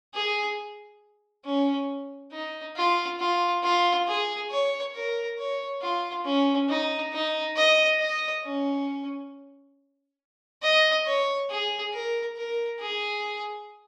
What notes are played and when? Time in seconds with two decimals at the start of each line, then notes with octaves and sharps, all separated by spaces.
0.14 G#4
1.45 C#4
2.32 D#4
2.76 F4
3.20 F4
3.63 F4
4.07 G#4
4.51 C#5
4.95 A#4
5.38 C#5
5.82 F4
6.25 C#4
6.69 D#4
7.13 D#4
7.56 D#5
8.00 D#5
8.44 C#4
10.62 D#5
11.06 C#5
11.50 G#4
11.93 A#4
12.37 A#4
12.80 G#4